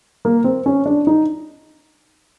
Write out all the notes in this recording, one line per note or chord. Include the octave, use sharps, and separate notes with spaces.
A#3
C4
C#4
D4
D#4